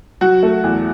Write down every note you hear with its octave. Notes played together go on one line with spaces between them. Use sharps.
F#3 F#4
A3
E2